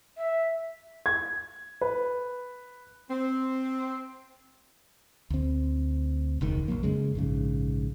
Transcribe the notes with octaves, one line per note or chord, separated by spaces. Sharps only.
E5
G#6
B4
C4
D2 C4
E1 C#2 D#3
A#1 E2 F#3 A#3
F#2 C#3 G#3
A#1 G#2 C#3